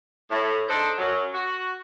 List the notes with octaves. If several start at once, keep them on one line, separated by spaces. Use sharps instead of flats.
A2
D4 D#4 G#4 A4 C5
F#2 F#3
F#4